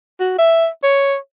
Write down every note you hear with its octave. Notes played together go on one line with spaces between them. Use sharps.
F#4
E5
C#5